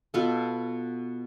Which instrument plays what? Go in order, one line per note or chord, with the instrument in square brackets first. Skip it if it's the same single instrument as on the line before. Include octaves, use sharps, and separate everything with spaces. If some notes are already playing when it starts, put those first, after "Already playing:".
[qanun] B2 B3 F4 A4